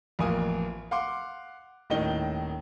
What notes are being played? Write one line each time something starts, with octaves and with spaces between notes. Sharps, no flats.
A1 F2 F3 A#3 G#5 D#6
F5 F#5 C6 D6
D#1 A2 D#3 C#4 D#5 G7